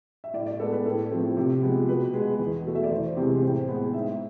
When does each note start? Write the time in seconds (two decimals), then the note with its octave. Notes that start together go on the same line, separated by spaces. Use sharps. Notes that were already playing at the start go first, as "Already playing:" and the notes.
0.24 E5
0.34 A2 D5
0.47 D5
0.59 G#3 B3 A4
0.72 B4
0.85 A2 A4
1.11 F3 A3 C4
1.37 C3
1.62 F3 G#3 B3
1.89 B2 B4
2.14 G#3
2.19 B3
2.39 E2
2.65 B2 A3
2.75 E5
2.84 D5
2.91 E2 C5
3.17 C3 E3 G#3
3.42 A2 C5
3.68 G#3 B3
3.94 G#2 E5